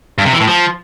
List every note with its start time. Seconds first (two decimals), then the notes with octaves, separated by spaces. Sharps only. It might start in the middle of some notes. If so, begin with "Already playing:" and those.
0.18 G2
0.26 C3
0.33 E3
0.40 A2
0.47 F3